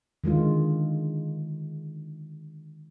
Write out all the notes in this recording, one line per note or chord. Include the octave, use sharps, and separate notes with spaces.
D3 D#3 G#3 F4